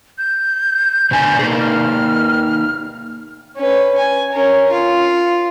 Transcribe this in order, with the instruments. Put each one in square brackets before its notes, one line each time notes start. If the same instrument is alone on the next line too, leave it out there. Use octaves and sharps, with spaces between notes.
[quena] G6
[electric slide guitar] B2 D3 G#5
A#3 D#4 G#4
[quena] F6
[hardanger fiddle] C#4 B4
G#5
C#4 A#4
F4